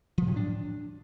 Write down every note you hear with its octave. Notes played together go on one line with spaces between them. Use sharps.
F3
A2
D4